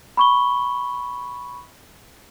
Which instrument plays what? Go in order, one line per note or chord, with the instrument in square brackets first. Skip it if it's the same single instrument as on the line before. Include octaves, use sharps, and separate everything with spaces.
[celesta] B5 C#6 G7